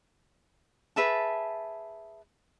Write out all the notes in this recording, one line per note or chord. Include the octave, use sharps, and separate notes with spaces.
G#4 B4 E5 A5